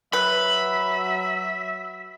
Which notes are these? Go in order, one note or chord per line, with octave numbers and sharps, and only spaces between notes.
F#3 B4 E5 B5